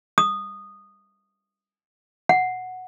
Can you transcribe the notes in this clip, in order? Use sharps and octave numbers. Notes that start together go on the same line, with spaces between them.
D#6
F#5